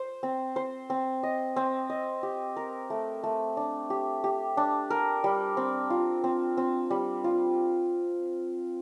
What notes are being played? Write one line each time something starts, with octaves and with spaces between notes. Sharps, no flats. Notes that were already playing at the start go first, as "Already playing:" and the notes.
Already playing: C5
C4
C5
C4
D#5
C4
D#5
G4
A#4
A3
A3
D4
G4
G4
D4
A#4
G3
C4
F4
C4
C4
G3
F4